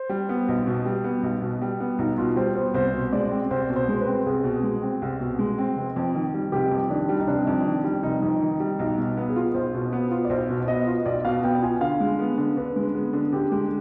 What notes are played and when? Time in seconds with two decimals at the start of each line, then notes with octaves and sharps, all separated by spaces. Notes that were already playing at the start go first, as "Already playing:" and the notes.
Already playing: C5
0.09 G3
0.29 B3
0.48 B1
0.67 B2
0.85 G3
1.04 B3
1.23 B1
1.42 B2
1.62 G3
1.80 B3
1.99 B1 D#4
2.18 B2 F4
2.36 G3 C5
2.55 B3 C5
2.74 C2 C5
2.94 B2
3.13 G#3 D5
3.31 C4
3.51 C2 C5
3.70 B2
3.76 C5
3.88 G#3
4.01 B4
4.07 C4
4.26 C2 G#4
4.44 B2
4.63 G#3
4.82 C4
5.02 C2
5.20 B2
5.39 G#3
5.58 C4
5.76 F1
5.96 F2
6.15 D#3
6.34 G3
6.52 F1 G4
6.71 F2
6.90 D#3 D4
7.09 G3
7.20 D#4
7.27 F1 D4
7.47 F2
7.66 D#3
7.84 G3
8.03 F1 D#4
8.22 F2
8.42 D#3
8.60 G3
8.79 B1 D#4
8.98 B2
9.17 B3
9.29 G#4
9.36 F4
9.54 B1 C5
9.74 B2
9.93 B3
10.11 F4
10.25 D5
10.30 B1 C5
10.50 B2
10.68 B3 D#5
10.87 F4
11.06 B1 D5
11.25 B2 F5
11.44 B3 G5
11.62 F4 G#5
11.81 D3 F5
12.00 G#3
12.20 B3
12.38 D3
12.57 D3 B4
12.76 G#3
12.95 B3 G#4
13.13 D3
13.32 D3 G4
13.51 G#3 G4